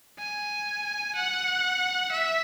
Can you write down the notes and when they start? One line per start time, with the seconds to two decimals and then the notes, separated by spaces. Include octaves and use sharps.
0.19 G#5
1.15 F#5
2.11 E5